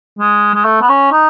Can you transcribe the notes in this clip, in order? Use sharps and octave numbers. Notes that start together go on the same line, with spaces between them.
G#3
G#3
A3
B3
C#4
D#4